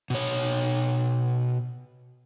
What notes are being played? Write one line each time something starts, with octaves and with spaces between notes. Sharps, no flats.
B2 C#5